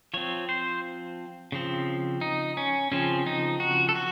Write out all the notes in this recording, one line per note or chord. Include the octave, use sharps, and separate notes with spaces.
F3 C4 C#5
C5
C#3 F3 C4
D#4
C#4
C#3 F3 C4 C#4
D#4
F#4
A4
F#4